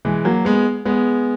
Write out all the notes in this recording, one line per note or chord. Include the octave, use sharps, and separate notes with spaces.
E3 G#3
F#3 A#3
G#3 B3
G#3 B3